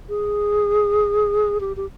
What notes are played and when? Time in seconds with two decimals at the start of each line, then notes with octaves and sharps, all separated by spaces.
0.09 G#4
1.61 G4
1.77 G4